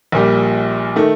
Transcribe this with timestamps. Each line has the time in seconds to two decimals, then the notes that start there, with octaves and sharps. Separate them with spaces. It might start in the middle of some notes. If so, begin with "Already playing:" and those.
0.12 A#1 A#2 G3
0.96 D#3 A3